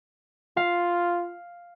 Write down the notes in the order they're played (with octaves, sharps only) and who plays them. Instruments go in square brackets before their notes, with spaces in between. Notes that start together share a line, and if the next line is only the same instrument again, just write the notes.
[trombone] F4 [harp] F5